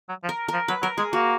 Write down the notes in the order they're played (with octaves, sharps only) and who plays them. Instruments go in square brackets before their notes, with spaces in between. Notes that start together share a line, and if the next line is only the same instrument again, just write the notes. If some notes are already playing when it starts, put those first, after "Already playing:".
[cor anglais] F#3
F3
[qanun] A#4
[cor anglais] F3 [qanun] A#4
[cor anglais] F#3 [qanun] B4
[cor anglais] F#3 [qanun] A#4
[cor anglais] G#3 [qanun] G#4
[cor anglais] A#3 [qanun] F#4